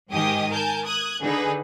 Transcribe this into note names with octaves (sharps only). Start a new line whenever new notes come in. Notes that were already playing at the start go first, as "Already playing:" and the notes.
G#2 D#3 G4 D#5 G#5 D#6
A#4 G#5 A5 G6
D#6 F#6 G#6
D3 D#4 G#4 B4